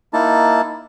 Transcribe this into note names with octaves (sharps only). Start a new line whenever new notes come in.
A#3 D#4 E4 A5